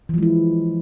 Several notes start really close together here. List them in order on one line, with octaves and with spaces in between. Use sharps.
E3 F3 G#3 E4